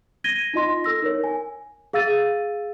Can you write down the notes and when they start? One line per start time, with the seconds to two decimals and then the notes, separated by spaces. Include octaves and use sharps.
0.24 G#6 A#6 D#7 G7
0.54 D#4 F4 D#5 C6 A#6
0.84 A4 E6 A#6
1.02 D#4 A#4 C#5
1.24 G#5
1.93 G#4 F5 E6 A6 D#7